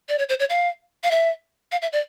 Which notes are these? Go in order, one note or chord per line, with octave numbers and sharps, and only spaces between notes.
D5
C#5
C5
C#5
F5
F5
E5
F5
E5
D5